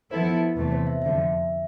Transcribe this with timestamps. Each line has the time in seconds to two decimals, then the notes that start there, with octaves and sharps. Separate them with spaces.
0.11 F3 B3 E4 A4 C5
0.56 E2 C3 E3 A3 B4
0.72 C5
0.87 E5
1.02 F2 D3 F3 E5